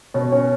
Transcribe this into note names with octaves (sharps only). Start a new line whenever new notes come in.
B2 C#5
C#4